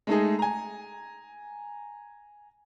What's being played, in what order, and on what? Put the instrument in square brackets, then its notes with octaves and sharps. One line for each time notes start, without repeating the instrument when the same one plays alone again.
[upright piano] G#3 A3 D#4 G#4
G#5 A#5